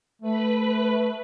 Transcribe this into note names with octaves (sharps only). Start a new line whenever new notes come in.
A3 B4 B5